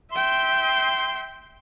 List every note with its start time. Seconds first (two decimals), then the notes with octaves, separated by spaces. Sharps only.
0.13 E5 G5 C6